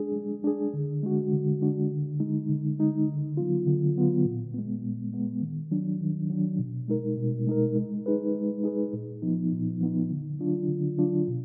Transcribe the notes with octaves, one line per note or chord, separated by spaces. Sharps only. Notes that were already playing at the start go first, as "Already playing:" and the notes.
Already playing: G#3 D4 G#4
G#3
D4 G#4
D3
G#3 D4 F#4
D3
G#3 D4 F#4
D3
G#3 D#4
D3
G#3 D#4
D3
F#3 B3 F4
D3
F#3 B3 F4
A#2
G#3 B3
A#2
G#3 B3
D#3
F#3 D4
D#3
F#3 D4
B2
G#3 D#4 A#4
B2
G#3 D#4 A#4
G#3
D#4 G#4 B4
G#3
D#4 G#4 B4
A#2
F3 B3 D#4
A#2
F3 B3 D#4
D3
F#3 D4 F4
D3
F#3 D4 F4
B2